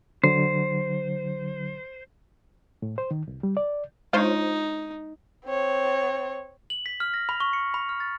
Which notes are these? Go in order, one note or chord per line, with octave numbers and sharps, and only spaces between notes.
D3 F#3 C5
A2
C5
D#3
C2
G3
D5
G#3 D4 D#4 F4 C5 C#5
C4 C#5
F#7
B6
F6
A#6
B5
C#6
C#7
B5
F6
A6